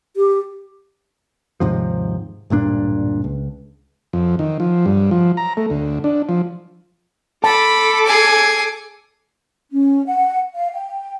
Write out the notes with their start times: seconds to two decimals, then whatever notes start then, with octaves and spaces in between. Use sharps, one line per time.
0.17 G4
1.60 D#2 G#2 C3 F3
2.50 D1 G2 A#2 D4
3.24 C#2
4.13 F2
4.39 D#3
4.60 F3
4.86 G2
5.11 F3
5.37 A#5
5.57 A3
5.70 D2
6.04 D4
6.29 F3
7.44 A4 A5 B5 D6
8.06 G#4 G#5
9.71 C#4
10.06 F#5
10.55 F5
10.72 G5